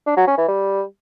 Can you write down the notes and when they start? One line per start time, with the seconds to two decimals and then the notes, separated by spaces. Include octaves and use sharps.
0.06 D4
0.17 F#3
0.27 C#4
0.37 E3
0.48 G3